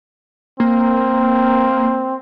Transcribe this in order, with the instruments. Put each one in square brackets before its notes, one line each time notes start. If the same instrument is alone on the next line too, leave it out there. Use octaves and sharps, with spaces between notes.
[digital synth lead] A#3 [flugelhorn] C4